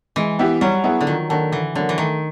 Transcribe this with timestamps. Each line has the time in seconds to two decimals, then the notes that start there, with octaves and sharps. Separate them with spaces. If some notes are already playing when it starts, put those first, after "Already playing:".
0.16 E3 G#3
0.39 B3 E4 G4
0.61 F#3 G3
0.84 B3 E4 G#4
1.01 D3
1.07 D#3 F3
1.29 D#3 A#3 D4 F#4 A4
1.52 D3 E3
1.75 D3 F#3 A#3
1.89 E3
1.98 D#3 A3